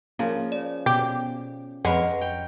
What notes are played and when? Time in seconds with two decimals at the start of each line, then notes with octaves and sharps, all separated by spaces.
0.19 C#3 F3 A#3
0.52 D5
0.86 B2 G4
1.85 F2 G#3 A#4 B4 C#5 D#5 F#5
2.21 G5